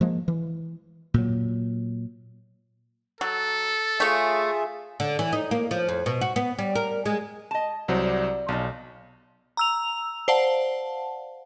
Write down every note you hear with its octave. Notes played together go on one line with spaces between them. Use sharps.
F3 G#3 A#3
E3
A#2 F#3
F#3 A4
A3 F4 G#4 C#5 E5
D3
E3
D#4
A#3
F3
F2
B2
F#4
B3
G3
A#4
G#3
D#5 A5
C2 F#3 C5 D5
B1 F3 D#4
A#5 E6 F7
C5 D5 F5 F#5 A5